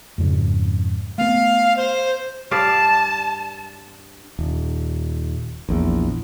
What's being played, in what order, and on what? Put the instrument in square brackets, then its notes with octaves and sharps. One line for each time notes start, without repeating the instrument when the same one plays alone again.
[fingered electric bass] F2 G#2 C#3
[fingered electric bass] A3 B3 [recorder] F5
[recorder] C5
[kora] G2 D5 F5 [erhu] A5
[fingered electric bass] D#1
A#1 E2